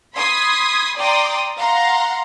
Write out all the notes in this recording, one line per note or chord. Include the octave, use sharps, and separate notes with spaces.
B5 C6 D#6 G#6 B6 C7
D5 G5 A#5 C6 D6 D#6
F5 F#5 A#5 C6